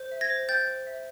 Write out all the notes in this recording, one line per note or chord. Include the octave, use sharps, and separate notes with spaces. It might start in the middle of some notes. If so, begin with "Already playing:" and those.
Already playing: C5
E5
G#6 A#6
C5
G5 G6 A6
C5
E5